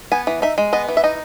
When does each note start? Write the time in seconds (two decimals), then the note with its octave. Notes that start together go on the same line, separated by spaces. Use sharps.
0.12 B3 G#5
0.27 E3
0.42 D#4 E5
0.58 G#3
0.73 B3 D#5
0.88 E3
0.97 E5
1.04 D#4 D#5